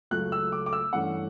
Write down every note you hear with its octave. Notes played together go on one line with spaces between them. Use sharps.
C#2 C#3 F#3 A3 F#6
E6
D6
D6
E6
G2 E3 A3 C#4 F#5